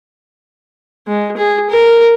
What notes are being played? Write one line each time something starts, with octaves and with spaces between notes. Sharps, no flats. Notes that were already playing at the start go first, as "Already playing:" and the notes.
G#3
G#4
A#4